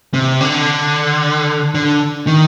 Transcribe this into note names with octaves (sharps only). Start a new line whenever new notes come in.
C3
D3
D3
D#3